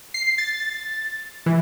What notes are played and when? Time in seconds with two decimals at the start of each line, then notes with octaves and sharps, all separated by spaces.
0.14 C7
0.38 A6
1.46 E3